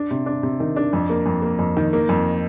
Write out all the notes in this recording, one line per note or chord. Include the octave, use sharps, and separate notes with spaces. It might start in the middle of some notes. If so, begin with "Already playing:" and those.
Already playing: D4
C3
D4
C3
D#3
D4
F2
A#3
F2
A#3
F2
D#3
A#3
F2